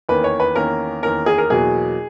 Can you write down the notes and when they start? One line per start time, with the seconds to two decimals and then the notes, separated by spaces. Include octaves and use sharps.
0.09 E2 D#3 A#3 C#4 B4
0.24 C#5
0.40 B4
0.55 E2 D#3 A#3 C#4 A#4
1.02 E2 D#3 A#3 C#4 A#4
1.26 G#4
1.38 A#4
1.50 E2 B2 F#3 A#3 G#4